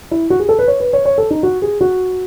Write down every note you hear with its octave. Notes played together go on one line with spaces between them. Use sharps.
E4
F#4
G#4
A4
B4
C#5
B4
C#5
C#5
A4
D#4
F#4
G#4
F#4